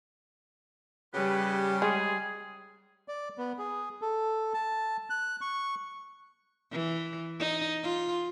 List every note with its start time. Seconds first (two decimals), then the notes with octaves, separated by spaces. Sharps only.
1.14 C#3 G3 G4 B4
1.82 G#3 G#4
3.08 D5
3.38 B3
3.58 G#4
4.01 A4
4.54 A5
5.10 F#6
5.41 C#6
6.71 E3
7.39 D#4
7.83 F4